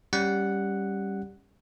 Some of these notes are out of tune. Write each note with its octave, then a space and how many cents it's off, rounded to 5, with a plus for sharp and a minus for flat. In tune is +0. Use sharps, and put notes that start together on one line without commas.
G3 +5 C#4 +0 F#5 +0